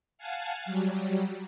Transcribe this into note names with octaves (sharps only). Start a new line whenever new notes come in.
F5 F#5 G#5 A5
F#3 G3